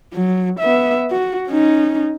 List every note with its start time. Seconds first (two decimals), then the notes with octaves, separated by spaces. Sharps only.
0.13 F#3
0.60 B3 E5
1.11 F#4
1.49 C#4 D#4